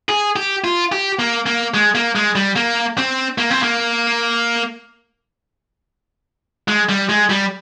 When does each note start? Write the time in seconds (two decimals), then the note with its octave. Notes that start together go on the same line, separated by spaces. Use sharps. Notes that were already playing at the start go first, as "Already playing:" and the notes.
0.09 G#4
0.36 G4
0.64 F4
0.92 G4
1.19 A#3
1.46 A#3
1.74 G#3
1.95 A#3
2.15 G#3
2.35 G3
2.56 A#3
2.97 C4
3.38 A#3
3.50 C4
3.63 A#3
6.68 G#3
6.89 G3
7.09 G#3
7.30 G3